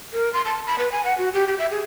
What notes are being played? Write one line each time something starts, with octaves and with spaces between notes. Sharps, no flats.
A#4
C6
A5
B5
B4
G#5
F#5
F#4
G4
G4
E5
G#4